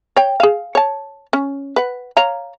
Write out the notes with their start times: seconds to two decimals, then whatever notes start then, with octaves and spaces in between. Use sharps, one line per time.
0.16 C#5 G5
0.40 G#4 F5
0.75 C#5 A5
1.33 C#4
1.76 B4 F#5
2.17 C#5 F5 A#5